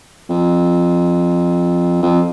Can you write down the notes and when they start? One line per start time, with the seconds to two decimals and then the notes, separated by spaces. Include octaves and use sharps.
0.30 F2
2.03 F2